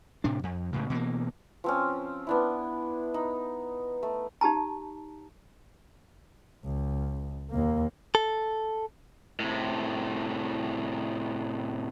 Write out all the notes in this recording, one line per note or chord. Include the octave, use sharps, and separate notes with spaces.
A2 C3 D4
F2
C#2 A2 C#3
B2 E3 F3 A#3
F3 C4 C#4
B3 D4 E4
D#4
A3
D#4 G4 A5 A#5
C#2
D#2 A#3
A4
A2 C3